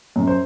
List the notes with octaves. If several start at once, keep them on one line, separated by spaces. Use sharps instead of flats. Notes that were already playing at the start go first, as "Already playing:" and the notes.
F#2
C5